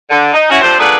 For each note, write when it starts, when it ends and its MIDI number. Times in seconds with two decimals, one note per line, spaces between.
0.10 0.31 50
0.33 0.48 63
0.50 0.58 61
0.50 0.58 64
0.50 0.58 66
0.61 0.78 48
0.61 0.78 53
0.61 0.78 57
0.61 0.78 62
0.61 0.78 72
0.79 0.97 46
0.79 0.97 57
0.79 0.97 59
0.79 0.97 62
0.79 0.97 68
0.79 0.97 71